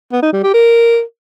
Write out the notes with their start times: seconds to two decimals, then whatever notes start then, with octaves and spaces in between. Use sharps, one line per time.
0.12 B3
0.23 D#4
0.33 G3
0.43 G4
0.54 A#4